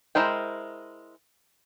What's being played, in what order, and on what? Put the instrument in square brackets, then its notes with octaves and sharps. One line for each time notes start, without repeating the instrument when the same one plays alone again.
[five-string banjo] G#3 E4 A#4 C5 G5